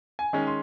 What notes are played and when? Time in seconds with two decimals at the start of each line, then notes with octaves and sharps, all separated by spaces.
0.19 G#5
0.33 D#3 G#3 C#4
0.47 C6